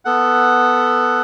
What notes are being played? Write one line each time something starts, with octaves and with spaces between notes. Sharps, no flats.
B3 A4 F#5